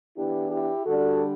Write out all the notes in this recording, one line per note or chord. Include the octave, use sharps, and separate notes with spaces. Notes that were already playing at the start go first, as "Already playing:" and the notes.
E3 B3 D4 E4 G4
E4 G4
D3 G3 D4 F#4 A4